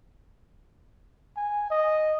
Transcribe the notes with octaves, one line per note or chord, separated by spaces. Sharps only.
G#5
D#5